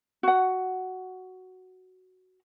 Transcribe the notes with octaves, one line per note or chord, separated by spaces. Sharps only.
F#4 F#5